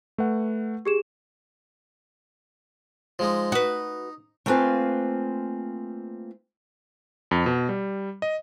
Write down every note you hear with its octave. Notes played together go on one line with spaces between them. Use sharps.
A3 B4 F#5
G4 G#4 E7
F3 G#3 D#4
D#4 F#4 B4
A3 A#3 C4 F4 B4 G#5
F2
B2
G3
D#5